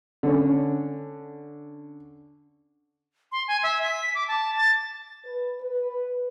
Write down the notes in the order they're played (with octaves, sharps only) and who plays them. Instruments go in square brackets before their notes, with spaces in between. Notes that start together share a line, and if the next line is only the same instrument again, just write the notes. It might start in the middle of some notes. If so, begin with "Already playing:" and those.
[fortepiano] D3 C#4
[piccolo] C6
G#5
E5
B6
D6
A5
A6
[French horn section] B4
B4